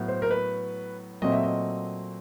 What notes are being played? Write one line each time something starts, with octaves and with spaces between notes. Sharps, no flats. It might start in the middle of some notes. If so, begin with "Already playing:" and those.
Already playing: A2 F#3 B3
C5
A#4
B4
A#2 F#3 A3 C4 D#5
E5
D#5